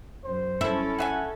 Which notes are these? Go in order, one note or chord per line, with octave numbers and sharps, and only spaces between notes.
F#2 C5
C#4 E4 A4 E5
G#4 E5 F#5 G#5